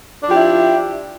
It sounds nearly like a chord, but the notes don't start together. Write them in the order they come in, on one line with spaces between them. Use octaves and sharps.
D4 F3 G4 E4